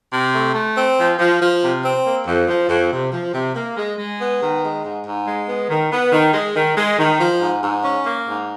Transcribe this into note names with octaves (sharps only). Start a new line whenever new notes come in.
C3
A3
A3
C4
F3
F3
F3
C3
C4
A#3
F2
F3
F2
C3
F3
C3
A#3
G#3
G#3
B3
D#3
G#3
G#2
G#2
G#3
B3
D#3
B3
D#3
G#3
D#3
G#3
D#3
F3
G#2
G#2
C#4
A#3
G#2